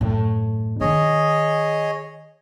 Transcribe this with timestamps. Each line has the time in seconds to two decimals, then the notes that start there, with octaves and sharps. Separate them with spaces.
0.01 F#2 A2
0.81 D#3 D#4 G#4 C#5 D#5